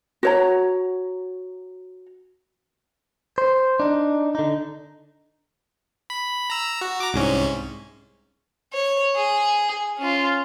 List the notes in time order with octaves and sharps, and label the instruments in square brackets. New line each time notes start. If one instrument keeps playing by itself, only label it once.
[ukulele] F#4 C#5 A#5
[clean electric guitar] C5
D4 D#4
D3 D#4
[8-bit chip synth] B5
A#5 E6
F#4
A#5 D6
C2 G#2 C#4
[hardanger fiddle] C#5
G#4
C#4 F4